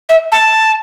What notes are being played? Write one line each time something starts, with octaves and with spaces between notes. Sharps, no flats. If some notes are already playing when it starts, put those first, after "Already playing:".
E5
A5